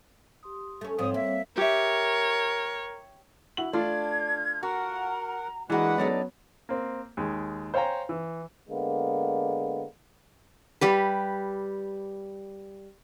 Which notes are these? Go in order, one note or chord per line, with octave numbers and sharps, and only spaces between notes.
G4 C6 D#6
A3 C#4
G#2 F3 G3 C4 C#5 D#6
A#3 E5
G4 A#4 C#5 E5
E4 F#4 F#7
A3 D4 F4 G#6
F#4 A#4 F#5 A#5
E3 G#3 A#3 D4 F#4 G#4 B4 F#5
F#3 B3 C#4 D#4 A4 D5
A#3 C4
D#2 G#3
C5 C#5 F5 G5 G#5 A#5
E3
D3 G#3 A#3 B3
G3 G4 B4